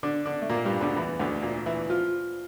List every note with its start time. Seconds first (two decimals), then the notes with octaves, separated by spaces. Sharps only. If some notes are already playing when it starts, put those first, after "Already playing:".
0.03 D3 D4
0.26 D3 D4
0.42 A3
0.50 A#2 A#3
0.65 G2 G3
0.81 D2 D3
0.96 E2 E3
1.20 D2 D3
1.42 A#2 A#3
1.66 E3 E4
1.90 F3 F4